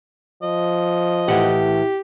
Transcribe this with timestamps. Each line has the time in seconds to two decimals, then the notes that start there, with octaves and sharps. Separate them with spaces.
0.43 F3 D#5
1.28 A2 E3 G4 F#5